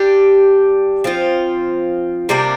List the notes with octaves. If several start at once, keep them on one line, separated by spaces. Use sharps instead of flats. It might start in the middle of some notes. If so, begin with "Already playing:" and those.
Already playing: G3 D4 G4
F3 C4 F4
C3 G3 A#3 D4